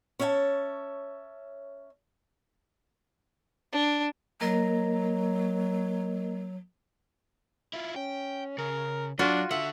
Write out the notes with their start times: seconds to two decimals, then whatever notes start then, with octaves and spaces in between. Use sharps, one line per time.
0.19 C#4 C#5 E5 G5 A5
3.72 D4
4.41 F#3 A#3 A#4 D#5
7.74 E4 F4
7.96 C#4 G5
8.58 C#3 A#4
9.19 F#3 D4 F4 F#4
9.51 D3 E5 F#5